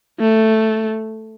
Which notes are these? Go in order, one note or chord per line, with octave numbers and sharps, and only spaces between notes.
A3